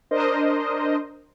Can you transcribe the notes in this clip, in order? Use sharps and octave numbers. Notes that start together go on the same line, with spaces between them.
D4 A#4 C5 D#5